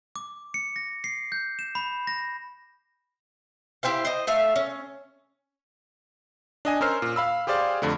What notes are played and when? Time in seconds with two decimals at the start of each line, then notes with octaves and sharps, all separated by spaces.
0.16 D6
0.54 C#7
0.76 A#6
1.04 C7
1.32 G6
1.59 E7
1.75 B5
2.07 A#6
3.83 E4 G4 C5 F5
4.05 C5 D#5
4.27 A3 E5 F5
4.56 C#4
6.65 D4 D#5 G#5
6.81 C#4 A#4 C5 E6 F6 C7
7.02 A#2
7.16 F5 B5 E6
7.47 G4 G#4 C5 D5 F5
7.82 F2 D3 A3